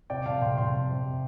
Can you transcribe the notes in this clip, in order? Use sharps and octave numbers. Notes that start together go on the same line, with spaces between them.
C3 D5 G5
F1 F5 A5
F1 G5 C6
F1 G5 C6
F1
C3